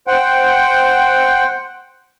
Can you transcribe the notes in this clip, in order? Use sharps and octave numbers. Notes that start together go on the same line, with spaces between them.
C5 F#5 G5